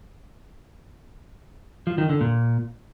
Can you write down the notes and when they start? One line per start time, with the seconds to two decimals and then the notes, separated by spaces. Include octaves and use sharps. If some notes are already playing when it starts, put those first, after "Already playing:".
1.87 F3
1.98 D#3
2.09 D3
2.21 A#2